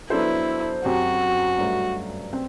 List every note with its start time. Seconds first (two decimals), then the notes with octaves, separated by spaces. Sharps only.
0.10 F#3 B3 D4 E4 A4 C5
0.85 F#2 F#3 C4 F#4 G4
1.59 G2 F#3 A3
2.33 C4